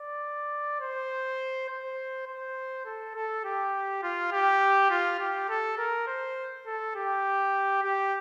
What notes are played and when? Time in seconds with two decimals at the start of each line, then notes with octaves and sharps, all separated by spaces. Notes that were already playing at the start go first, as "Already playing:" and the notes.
Already playing: D5
0.80 C5
1.69 C5
2.27 C5
2.85 A4
3.15 A4
3.45 G4
4.03 F4
4.32 G4
4.90 F4
5.20 G4
5.49 A4
5.78 A#4
6.07 C5
6.66 A4
6.95 G4
7.83 G4